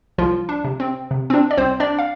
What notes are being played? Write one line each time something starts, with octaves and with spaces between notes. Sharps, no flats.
C2 F3 F4
D4
C3
C4
C3
C4
D4
D5
C2 C4 C5
D4 D5
F5